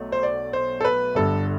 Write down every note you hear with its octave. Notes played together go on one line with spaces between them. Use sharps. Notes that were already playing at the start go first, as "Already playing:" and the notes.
Already playing: B1 B2 F#3 A3
C5
D5
C5
A4
B4
G1 G2 D3 A4